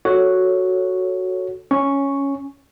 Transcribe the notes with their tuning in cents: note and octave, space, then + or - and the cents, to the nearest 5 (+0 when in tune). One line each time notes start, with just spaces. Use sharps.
F#4 +0 A4 +0 C#5 +0
C#4 +0 C#6 +0